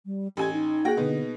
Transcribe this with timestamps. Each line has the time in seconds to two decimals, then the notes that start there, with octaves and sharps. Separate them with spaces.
0.06 G3
0.37 A1 G4 G#5 G#6
0.53 D#4
0.85 A#3 F#4 G#4 G5 A#6
0.97 B2 D3 B3 D#4